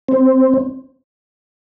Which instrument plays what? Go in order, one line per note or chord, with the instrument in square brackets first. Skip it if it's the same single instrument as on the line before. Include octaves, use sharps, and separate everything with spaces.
[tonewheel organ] C4